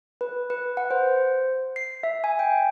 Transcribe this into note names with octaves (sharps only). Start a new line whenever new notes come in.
B4
B4
F#5
C5
C7
E5
G#5
G5